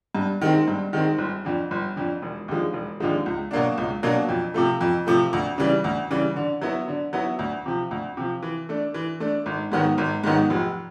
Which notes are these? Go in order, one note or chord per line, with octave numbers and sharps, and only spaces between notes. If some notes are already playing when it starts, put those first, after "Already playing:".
G2
D#3 G#3 C4
G2
D#3 G#3 C4
G1
F2 D3
G1
F2 D3
E1
D#2 D3 F3 G#3
E1
D#2 D3 F3 G#3
C#2
B2 F#3 A#3 D4
C#2
B2 F#3 A#3 D4
F2
C3 F3 A3
F2
C3 F3 A3
D2
C#3 E3 G3
D2
C#3 E3 G3
D3
F#3 B3 E4
D3
F#3 B3 E4
D2
C3 F3
D2
C3 F3
E3
A3 D4
E3
A3 D4
G#1
G#2 D#3 F#3 B3
G#1
G#2 D#3 F#3 B3
F1